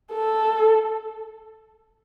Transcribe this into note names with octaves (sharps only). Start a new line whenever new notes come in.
A4